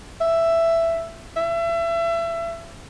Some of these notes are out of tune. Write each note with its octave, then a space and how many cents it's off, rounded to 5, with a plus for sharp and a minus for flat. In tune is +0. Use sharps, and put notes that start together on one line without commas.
E5 +10
E5 +30